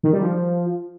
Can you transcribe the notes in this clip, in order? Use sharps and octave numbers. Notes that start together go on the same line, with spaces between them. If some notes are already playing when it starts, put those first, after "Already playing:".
D#3
G3
F3